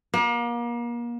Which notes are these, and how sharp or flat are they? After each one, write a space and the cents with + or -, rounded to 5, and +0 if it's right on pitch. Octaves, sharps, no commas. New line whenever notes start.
A#3 +35